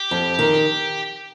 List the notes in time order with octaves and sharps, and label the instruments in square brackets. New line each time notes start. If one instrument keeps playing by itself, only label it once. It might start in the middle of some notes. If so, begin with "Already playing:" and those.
Already playing: [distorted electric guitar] G4
[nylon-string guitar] F2
D#3